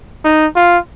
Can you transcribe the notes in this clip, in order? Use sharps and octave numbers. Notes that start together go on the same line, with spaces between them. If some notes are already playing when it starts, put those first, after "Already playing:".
D#4
F4